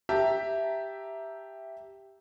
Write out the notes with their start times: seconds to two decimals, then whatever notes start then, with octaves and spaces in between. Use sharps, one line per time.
0.09 G4 E5 A5 A#5